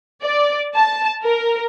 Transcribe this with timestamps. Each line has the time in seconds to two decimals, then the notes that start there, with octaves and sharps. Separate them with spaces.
0.23 D5
0.76 A5
1.23 A#4